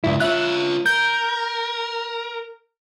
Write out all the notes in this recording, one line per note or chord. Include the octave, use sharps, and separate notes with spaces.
C#2 G2 E4
F4 C#5 E5 F#6
A#4 G6